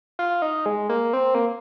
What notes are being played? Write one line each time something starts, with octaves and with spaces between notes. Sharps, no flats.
F4
D#4
G#3
A#3
C4
A#3